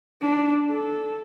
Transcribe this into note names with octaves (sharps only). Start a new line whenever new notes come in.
D4
A4